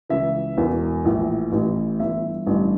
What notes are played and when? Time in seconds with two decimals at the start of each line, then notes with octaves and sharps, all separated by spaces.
0.09 C#2 C#3 E3 E5
0.57 E1 E2 E3
1.05 A#1 A2 E3
1.52 A1 A2 E3
1.99 G1 G2 E3 E5
2.46 A1 G2 D3